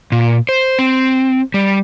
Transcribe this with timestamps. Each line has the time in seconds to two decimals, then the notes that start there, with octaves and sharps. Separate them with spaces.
0.12 A#2
0.49 C5
0.79 C4
1.54 G3